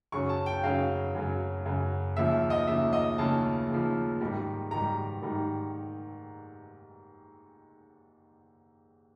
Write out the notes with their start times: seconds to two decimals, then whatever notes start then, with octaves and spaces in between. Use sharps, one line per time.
0.12 F#2 C#3 F#3 C#6
0.29 A5
0.46 G5
0.63 F#2 C#3 F#3 F5
1.15 F#2 C#3 F#3
1.65 F#2 C#3 F#3
2.16 D#2 C#3 F3 E5
2.50 D#5
2.67 D#2 C#3 F3 E5
2.93 D#5
3.18 D#2 C#3 F3 A5
3.69 D#2 C#3 F3
4.21 G#2 D#3 G3
4.71 G#2 D#3 G3 A#5
5.22 G#2 D#3 G3